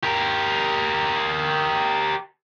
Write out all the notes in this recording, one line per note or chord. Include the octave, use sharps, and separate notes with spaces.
G4 A#4